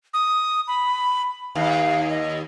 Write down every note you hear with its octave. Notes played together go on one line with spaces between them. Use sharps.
D#6
B5
D#2 F5
D#5